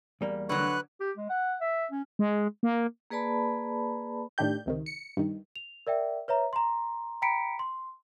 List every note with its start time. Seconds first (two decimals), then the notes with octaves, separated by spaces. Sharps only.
0.21 E2 G3 A#3
0.49 D3 F#3 B4 C#6 F#6
1.00 G4
1.17 G#3
1.30 F#5
1.61 E5
1.91 C#4
2.19 G#3
2.63 A#3
3.10 A#3 G#4 B4 D5 A5 B5
4.38 A2 D#3 D4 G4 G6
4.66 C#2 C3 D#3
4.86 C#7
5.17 G2 D#3
5.56 F7
5.87 A#4 D5 E5 G5
6.28 B4 C#5 E5 A#5
6.53 A#5 C6
7.22 G5 A#5 B5 B6 C#7 D7
7.59 C6